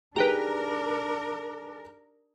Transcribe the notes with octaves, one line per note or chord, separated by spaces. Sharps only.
D4 D#4 G4 G#4 A#4 B4 G5 A#5